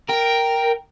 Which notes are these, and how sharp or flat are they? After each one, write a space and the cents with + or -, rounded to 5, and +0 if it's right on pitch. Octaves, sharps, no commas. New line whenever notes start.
A#4 +0 G5 +0